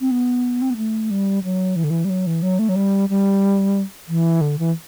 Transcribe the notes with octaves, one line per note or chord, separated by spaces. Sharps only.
C4
B3
C4
B3
A3
G3
F#3
E3
D3
E3
G3
F#3
E3
F#3
A3
F#3
G3
G3
E3
D3
E3